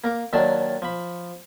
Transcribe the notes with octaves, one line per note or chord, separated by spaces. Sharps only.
A#3 A#4 D6
D#2 D#3 F#3 D4 D5 A5
F3 B5